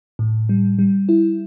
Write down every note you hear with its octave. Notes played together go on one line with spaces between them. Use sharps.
A2
G3
G3
E4